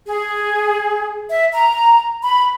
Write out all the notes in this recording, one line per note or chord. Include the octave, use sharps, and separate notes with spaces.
G#4
E5
A#5
B5